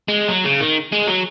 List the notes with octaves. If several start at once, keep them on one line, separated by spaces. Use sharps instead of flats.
G#3
F#3
C#3
D#3
G#3
F#3